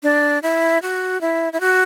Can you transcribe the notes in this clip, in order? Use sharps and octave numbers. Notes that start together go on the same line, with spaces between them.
D4
E4
F#4
E4
E4
F#4